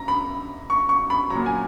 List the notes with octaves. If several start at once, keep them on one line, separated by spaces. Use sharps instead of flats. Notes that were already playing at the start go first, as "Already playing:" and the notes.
Already playing: A#5
B5
C#6
C#6
B5
A#2 F#3 A#5
G#5